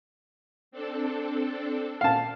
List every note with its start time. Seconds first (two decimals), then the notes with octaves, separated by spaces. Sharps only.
0.71 C4 D4 A4
2.01 A#2 F5 A5